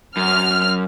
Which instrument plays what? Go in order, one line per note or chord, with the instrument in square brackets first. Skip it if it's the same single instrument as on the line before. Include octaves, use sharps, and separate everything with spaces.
[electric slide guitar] F#2 [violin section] F6